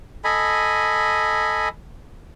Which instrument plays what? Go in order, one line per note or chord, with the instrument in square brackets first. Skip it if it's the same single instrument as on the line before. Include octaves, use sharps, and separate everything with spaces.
[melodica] A4 D#5 G#5 B5